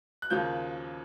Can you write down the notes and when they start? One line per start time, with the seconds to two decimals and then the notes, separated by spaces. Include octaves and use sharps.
0.22 F#6
0.30 D#2 C#3 F3 A#3 G6